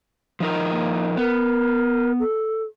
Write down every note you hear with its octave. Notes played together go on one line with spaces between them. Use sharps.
F3 D#4 A#4
A#3
B3 A#4
A4